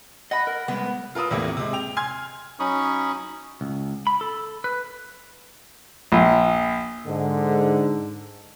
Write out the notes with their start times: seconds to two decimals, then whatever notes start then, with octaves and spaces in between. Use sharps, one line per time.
0.31 D#5 F#5 B5
0.47 A#4
0.68 C3 G3 G#3 B3
1.15 F4 A#4 B4 D#6 E6
1.31 E2 A2 C3 F3 A3 A#3
1.57 C3 G#3
1.73 G5 F7
1.97 G#5 C6 F6 G#6
2.60 F#3 C#4 D#4 B5 C#6 D#6
3.61 C#2
4.07 B5
4.21 A4
4.64 B4
6.12 A#1
7.07 G#2 D3